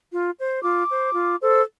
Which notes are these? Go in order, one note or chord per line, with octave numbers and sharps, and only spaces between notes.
F4
C5
F4 D6
C5
F4
A4 C5